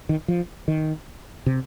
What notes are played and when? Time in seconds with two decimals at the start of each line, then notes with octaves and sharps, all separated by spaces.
0.09 D#3
0.28 F3
0.68 D#3
1.46 C3